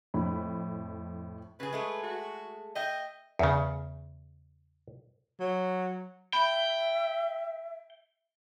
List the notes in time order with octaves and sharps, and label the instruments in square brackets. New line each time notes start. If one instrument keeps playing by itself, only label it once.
[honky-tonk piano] F2 A2 B5
[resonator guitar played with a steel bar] C#3 G#4 [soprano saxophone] B4
[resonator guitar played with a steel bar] G#3 A3 G#4
[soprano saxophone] F#4
[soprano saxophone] D#5 [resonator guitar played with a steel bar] E5 G5
[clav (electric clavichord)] E2 C#3
[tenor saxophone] F#3
[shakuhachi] E5 [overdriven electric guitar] G5 [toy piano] B5